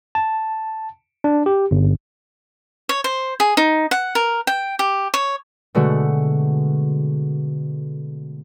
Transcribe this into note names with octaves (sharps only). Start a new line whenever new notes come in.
A5
D4
G4
G1
C#5
C5
G#4
D#4
F#5
A#4
G5
G4
C#5
B2 D3 G#3 A3 F#4